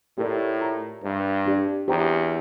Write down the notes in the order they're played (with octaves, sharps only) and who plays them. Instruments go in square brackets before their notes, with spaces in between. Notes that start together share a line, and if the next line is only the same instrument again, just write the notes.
[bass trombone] A2 [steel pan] G4 A#4 D5
[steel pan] F4 A#4 E5 A#5
[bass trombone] G2 [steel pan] C5 E5 A#5
[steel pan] D4 G4 D5
[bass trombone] E2 [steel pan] G4 C5 G5 A#5